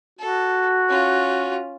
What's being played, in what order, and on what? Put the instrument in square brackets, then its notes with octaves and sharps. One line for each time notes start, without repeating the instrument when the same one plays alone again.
[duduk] F#4 [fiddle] A4
[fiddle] C#4 F4